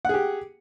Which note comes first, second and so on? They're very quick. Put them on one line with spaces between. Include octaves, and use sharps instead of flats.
F#5 G#4 G4